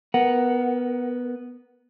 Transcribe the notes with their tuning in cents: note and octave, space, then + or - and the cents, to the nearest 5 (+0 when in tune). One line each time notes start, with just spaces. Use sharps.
B3 +0 A#4 +15 F#5 +5